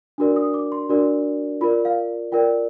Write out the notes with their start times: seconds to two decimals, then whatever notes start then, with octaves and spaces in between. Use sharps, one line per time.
0.18 D4 F#4 A#4 D5
0.36 D#6
0.54 D6
0.72 C6
0.89 D4 F#4 A#4 D5
1.61 F4 A#4 D5 B5
1.85 F5
2.32 F4 A#4 D5 G5